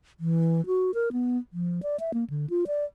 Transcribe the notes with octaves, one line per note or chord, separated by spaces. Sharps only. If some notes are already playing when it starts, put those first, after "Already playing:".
E3
F#4
A#4
B3
F3
D5
E5
A#3
D3
F4
D5